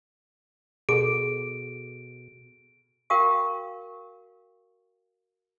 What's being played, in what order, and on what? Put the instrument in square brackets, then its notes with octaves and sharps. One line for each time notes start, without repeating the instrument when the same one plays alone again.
[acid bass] B2 [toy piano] G#4 A4 [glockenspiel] D7
[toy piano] F#4 A#4 F5 G5 C#6 D#6